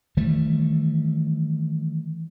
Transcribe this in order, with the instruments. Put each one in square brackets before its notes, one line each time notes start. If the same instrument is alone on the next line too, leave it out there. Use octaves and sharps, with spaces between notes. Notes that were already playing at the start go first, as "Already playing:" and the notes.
[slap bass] D#3 E3 G3 A3